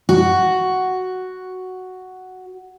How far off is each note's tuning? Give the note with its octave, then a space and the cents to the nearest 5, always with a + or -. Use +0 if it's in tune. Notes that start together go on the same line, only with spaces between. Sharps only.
F#4 +5